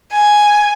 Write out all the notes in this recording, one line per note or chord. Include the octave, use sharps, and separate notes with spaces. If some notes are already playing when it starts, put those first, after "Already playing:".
G#5